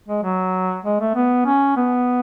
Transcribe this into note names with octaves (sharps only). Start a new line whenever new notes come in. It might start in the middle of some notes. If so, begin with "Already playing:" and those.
G#3
F#3
G#3
A3
B3
C#4
B3